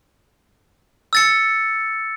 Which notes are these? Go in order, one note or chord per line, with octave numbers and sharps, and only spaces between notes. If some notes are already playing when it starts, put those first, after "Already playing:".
E6 A6 C#7